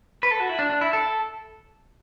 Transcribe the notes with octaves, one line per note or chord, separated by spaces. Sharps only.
B4
A4
F#4
E4
D4
D4
E4
A4